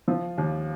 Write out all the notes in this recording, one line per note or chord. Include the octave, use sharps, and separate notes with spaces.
F3
D#2